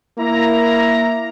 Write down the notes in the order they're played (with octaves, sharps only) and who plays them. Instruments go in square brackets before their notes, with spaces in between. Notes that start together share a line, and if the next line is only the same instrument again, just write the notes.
[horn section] A#3 E4 A#5